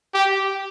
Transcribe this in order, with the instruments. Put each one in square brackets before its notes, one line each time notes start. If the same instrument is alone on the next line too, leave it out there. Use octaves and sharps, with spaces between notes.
[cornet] G4